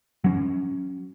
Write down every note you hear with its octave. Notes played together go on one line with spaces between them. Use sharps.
F#3 C#4